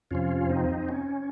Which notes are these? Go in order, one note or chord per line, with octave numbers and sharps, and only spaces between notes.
F2 C3 F3 C#4 F4
C4 D#4
C#4